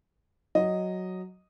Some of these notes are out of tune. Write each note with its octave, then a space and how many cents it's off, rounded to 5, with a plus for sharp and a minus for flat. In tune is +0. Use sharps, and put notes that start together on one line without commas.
F#3 +0 D#5 +0